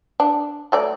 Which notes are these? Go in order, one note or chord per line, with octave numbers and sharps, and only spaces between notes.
D4
F#3 A3 D5